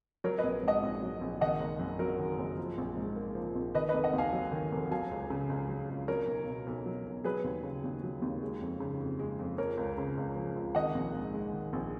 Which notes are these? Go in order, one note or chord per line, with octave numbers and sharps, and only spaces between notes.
F#3 A#4 C#5
B4 D#5
A#1
G#2 D#5 F#5
A#1
F#3
A#1
D#3 D#5 F#5
F#1
F#2
F#3 F#4 A#4
D#3
F#1
F3
A#1
G#2
A#3
F3
A#1
D#3 B4 D#5
B4 D#5
F1
D#5 F#5
D#2
F5 G#5
F#3
D#3
F1
F#3 F5 G#5
C#2
C#3
C#2
F#3
C#2
F#3 A#4 C#5
B1
B2
B1
F#3
B1
F#3 G#4 B4
D#2
C#3
D#2
F#3
D#2
G#3
F2
C#3
F2
G#3
F2
F3 A#4 C#5
C#2
C#3
C#2
F3
C#2
D#3 D#5 F#5
A#1
G#2
G#3
D#3
A#1